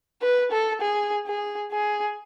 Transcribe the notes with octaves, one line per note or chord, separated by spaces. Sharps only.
B4
A4
G#4
G#4
G#4